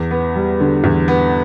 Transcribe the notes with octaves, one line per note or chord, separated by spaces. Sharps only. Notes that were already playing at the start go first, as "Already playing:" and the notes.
Already playing: E2
B3
G3
D3
E2
B3